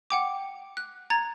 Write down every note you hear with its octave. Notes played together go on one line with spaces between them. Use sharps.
F#5 G5 D6
F#6
A#5 G#6 A6